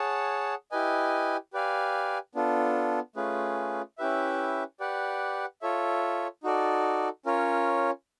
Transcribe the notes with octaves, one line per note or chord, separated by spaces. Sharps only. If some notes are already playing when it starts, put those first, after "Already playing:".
Already playing: G#4 C#5 F#5 A5
E4 G4 B4 D#5 G#5
G4 B4 D5 F5 G#5
B3 D4 F4 A4
A3 C#4 F4 G#4 B4
C#4 E4 G4 B4 E5
G4 B4 D5 F#5
F4 A4 C#5 E5
D#4 F#4 A4 D5
C#4 F4 A#4 C#5